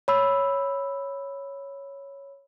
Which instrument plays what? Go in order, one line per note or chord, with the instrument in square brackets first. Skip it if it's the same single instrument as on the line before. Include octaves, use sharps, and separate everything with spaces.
[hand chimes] C#5 B5 E6